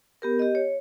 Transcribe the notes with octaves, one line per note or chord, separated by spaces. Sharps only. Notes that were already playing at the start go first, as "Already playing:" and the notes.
B3 G4 A#4
G4 D#5
C#5